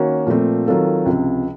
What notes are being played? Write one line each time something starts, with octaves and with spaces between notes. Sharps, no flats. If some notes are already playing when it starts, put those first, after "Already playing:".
Already playing: D#3 A#3 C#4 F#4
A#2 F3 A3 C4
D#3 F#3 C4 F4 A4
C#2 C3 F3